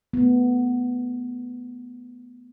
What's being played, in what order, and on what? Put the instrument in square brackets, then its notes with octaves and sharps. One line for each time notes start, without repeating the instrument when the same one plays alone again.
[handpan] A3 B3